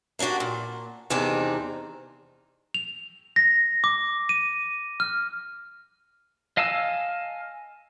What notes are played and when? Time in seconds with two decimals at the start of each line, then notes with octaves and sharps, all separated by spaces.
0.19 A#3 D4 D#4 F#4 G4
0.40 A#2
1.10 E2 C3 D#3 C4 D4 D#4
2.74 F7
3.36 A#6
3.84 D6
4.29 D#7
5.00 F6
6.57 D#5 F5 G#5 A5 E6